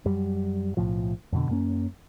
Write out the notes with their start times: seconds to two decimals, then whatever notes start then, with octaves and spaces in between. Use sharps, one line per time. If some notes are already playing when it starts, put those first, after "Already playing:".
0.06 F#2 G3
0.77 B1 A2 F3
1.32 F2 B2 D3
1.49 F#2 A#3 C#4